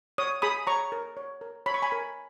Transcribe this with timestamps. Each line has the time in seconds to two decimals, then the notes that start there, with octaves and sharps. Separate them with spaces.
0.18 C#5 D#6
0.42 G#4 B5 D#6
0.67 C#5 A#5 C#6
0.92 A#4
1.17 C#5
1.41 A#4
1.66 C#5 B5
1.74 C#6
1.82 G#5 B5
1.92 A#4